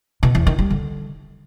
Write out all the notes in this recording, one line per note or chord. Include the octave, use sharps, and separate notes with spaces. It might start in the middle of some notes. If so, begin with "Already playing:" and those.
B2
E2
D#3
G3
D3